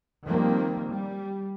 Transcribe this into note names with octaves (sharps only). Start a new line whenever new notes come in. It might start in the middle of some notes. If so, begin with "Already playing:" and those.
D#3 F3 G3 A#3 C4
G3